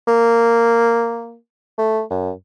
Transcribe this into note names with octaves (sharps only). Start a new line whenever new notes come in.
A#3
A3
F#2